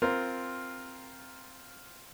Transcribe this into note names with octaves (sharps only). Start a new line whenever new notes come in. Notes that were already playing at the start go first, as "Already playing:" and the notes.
C4 F4 A#4